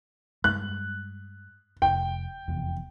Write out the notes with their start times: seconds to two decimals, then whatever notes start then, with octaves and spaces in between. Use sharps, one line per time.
0.44 G2 G#3 F#6
1.82 F1 G5
2.48 F1 E2